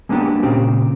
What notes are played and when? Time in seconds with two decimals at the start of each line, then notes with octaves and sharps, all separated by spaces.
0.09 G#3 A#3 B3 C#4 D4 G4
0.43 A#2 C#3 C4 G4